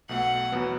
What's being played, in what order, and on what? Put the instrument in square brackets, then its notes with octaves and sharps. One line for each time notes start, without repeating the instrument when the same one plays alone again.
[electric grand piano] B1 B2 A3 [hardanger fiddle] F#5
[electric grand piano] E2 B2 F#3 B3